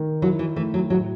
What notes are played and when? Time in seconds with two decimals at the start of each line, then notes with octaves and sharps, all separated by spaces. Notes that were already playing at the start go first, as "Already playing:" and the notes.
Already playing: D#3
0.22 F#3 E4
0.39 E3
0.56 E3 A3
0.74 F#3
0.90 A2 F#3